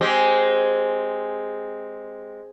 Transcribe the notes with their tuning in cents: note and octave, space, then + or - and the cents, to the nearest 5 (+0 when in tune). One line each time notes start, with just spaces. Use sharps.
G#3 +0 C4 +0 G4 -20